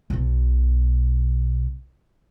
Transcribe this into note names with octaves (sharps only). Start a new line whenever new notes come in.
B1 B2